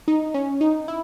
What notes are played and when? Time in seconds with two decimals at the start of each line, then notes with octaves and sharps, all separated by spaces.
0.08 D#4
0.34 C#4
0.61 D#4
0.88 E4